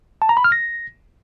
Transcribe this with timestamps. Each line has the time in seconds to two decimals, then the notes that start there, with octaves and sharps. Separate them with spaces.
0.22 A5
0.29 A#5
0.37 B5
0.44 F6
0.52 A#6